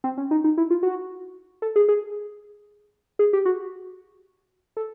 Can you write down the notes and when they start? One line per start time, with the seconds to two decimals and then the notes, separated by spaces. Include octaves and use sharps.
0.04 C4
0.18 C#4
0.31 D#4
0.44 D#4
0.58 E4
0.70 F4
0.83 F#4
1.62 A4
1.76 G#4
1.88 G#4
3.19 G#4
3.33 G4
3.45 F#4
4.77 A4